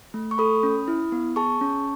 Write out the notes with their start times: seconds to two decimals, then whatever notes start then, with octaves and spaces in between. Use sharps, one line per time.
0.14 A3
0.31 C#6
0.38 A4 B5 D#6
0.63 C#4
0.88 E4
1.12 B3
1.36 G#4 A5 C#6
1.61 C#4